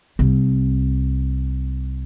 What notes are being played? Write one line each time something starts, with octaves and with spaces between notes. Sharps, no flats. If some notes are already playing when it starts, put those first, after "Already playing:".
C2 C4